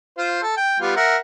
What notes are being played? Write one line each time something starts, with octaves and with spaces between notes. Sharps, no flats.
F4 C5
A4
G5
G3 B3 F4
A#4 E5 F#5